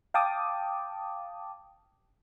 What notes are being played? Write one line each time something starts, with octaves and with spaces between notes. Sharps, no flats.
F5 G5 A5 D6 D#6